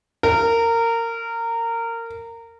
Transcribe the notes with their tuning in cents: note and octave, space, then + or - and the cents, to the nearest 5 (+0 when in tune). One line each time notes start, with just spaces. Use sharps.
A#4 -20